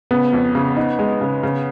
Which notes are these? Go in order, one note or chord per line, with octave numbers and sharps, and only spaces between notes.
C#3 B3
F2
C#3
D#4
G#3
C#3
C#3